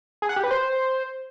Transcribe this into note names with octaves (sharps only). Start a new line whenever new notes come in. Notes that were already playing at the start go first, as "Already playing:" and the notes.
G#4
F#5
G4
B4
C5